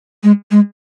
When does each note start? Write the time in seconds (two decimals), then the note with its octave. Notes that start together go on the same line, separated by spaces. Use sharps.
0.24 G#3
0.51 G#3